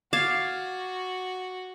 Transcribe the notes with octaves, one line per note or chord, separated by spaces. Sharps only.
F#4 F5 D6 G#6 A6